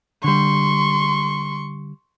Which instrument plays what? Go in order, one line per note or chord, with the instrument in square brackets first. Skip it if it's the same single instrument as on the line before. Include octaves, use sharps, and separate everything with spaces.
[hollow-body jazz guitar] D3 G3 [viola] C6 C#6